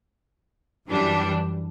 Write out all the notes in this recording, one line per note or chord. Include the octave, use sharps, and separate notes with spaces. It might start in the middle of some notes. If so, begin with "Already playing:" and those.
F#2 E3 G3 D4